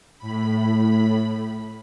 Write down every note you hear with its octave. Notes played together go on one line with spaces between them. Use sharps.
A2 B5